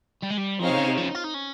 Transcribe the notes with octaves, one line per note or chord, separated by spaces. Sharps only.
G3
G#3
G3
F3 C4 D#4 G#4 C#5 F5
C3
C#3
C3
F3 C#4
D#4
F4
D#4
C#4